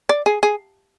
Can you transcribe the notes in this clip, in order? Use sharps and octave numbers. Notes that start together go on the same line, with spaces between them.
D5
G#4
G#4